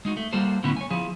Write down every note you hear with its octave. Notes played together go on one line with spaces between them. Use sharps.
G#3 D#4 F#4
A3
G3 A#3 F#4 A4 C5
A2 D3 B3 C#4 E4
C#5 G#5
F3 E4 G#4